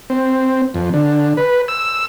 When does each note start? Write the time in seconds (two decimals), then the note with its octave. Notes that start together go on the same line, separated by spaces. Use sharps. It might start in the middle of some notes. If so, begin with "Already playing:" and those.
0.10 C4
0.74 F2
0.94 D3
1.37 B4
1.68 E6